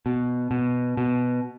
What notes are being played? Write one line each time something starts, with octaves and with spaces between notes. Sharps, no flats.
B2
B2
B2